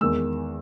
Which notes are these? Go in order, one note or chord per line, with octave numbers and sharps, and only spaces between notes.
E2 D#3 G#3 E6